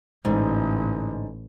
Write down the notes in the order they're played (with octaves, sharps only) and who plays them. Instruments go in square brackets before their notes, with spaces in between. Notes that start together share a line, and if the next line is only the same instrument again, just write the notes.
[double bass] A1 [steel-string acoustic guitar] G#2 D3